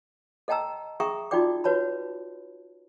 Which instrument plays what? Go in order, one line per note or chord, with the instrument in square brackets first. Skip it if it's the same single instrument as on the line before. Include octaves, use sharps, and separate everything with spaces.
[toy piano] A4 D#5 G5 A5 A#5 E6
G#4 E5 G5 A#5 C#6 D#6
D#4 F4 F#4 D5 G5 D6
F#4 B4 C#5 A5 B5